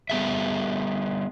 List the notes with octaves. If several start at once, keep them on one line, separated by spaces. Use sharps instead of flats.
G3 B3 G#4 E5